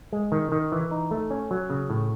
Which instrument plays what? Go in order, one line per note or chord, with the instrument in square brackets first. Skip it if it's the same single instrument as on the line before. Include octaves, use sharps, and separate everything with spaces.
[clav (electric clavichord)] G#3
D#3
D#3
E3
D#4
A3
C#4
F#3
C#3
A2